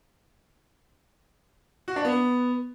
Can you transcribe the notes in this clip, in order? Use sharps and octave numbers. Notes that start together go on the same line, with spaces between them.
F#4
D4
B3